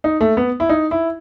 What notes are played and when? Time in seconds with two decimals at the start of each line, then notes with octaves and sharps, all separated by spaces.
0.04 D#4
0.21 A3
0.37 B3
0.60 E4
0.69 D#4
0.91 E4